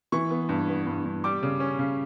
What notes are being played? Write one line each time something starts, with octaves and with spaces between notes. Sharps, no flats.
E3 C#6
B3
G2
B3
G2
G2
G3 D6
C#3
C#4
C#3